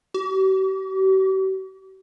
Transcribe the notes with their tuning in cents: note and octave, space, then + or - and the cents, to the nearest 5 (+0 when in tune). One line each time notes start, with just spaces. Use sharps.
G4 -45